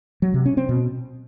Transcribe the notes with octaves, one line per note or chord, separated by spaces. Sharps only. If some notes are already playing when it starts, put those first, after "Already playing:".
F#3
C3
C#4
C4
B2